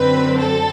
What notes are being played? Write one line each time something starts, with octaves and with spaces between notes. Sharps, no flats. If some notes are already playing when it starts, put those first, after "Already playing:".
Already playing: F#2 D3 F#3 C4 B4
A4